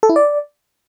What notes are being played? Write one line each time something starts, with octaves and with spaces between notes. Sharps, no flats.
A4
E4
D5